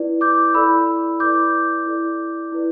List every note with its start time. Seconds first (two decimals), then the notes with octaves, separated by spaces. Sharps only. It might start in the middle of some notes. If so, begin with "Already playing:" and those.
Already playing: E4 B4 D5
0.21 D6 G6
0.54 E4 A4 D5 B5 E6
1.20 E4 B4 D5 D6 G6
1.86 E4 A4 D5
2.52 E4 B4 D5